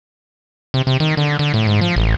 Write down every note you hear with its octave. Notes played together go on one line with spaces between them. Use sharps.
C3
C3
D#3
D3
D3
A2
G#2
F3
A1